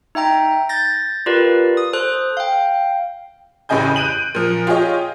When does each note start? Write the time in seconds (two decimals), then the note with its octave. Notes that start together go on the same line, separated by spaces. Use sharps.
0.15 D#4 E5 G5 A#5
0.69 G6 A6 A#6
1.26 F4 G4 A#4 B4 D5
1.77 D#6
1.93 A4 C5 F#6
2.37 F5 G5
3.69 A1 A2 C#3 D#5 G#5 G6
3.96 F#6 G6 D7 D#7 F#7
4.34 A#2 F3
4.67 F4 G4 G#4 C#5 D#5